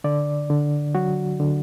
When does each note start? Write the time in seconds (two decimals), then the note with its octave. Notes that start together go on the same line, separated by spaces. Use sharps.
0.04 D3 D5
0.50 D3
0.95 F#3 F#4
1.40 D3